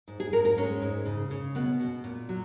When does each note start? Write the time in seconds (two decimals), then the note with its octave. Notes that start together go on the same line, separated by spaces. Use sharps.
0.08 G#2
0.20 G#4
0.32 G#2 A#4
0.45 A#4
0.57 G#3 C#4
0.82 G#2
1.06 C#3
1.30 C#3
1.55 B2 B3
1.80 B2
2.04 A#2
2.29 F#3